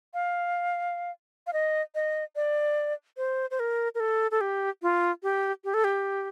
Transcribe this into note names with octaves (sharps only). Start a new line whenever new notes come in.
F5
F5
D#5
D#5
D5
C5
C5
A#4
A#4
A4
A4
G4
F4
G4
G4
A4
G4